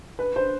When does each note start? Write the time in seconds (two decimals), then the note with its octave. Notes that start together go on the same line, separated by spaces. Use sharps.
0.19 B4
0.36 C5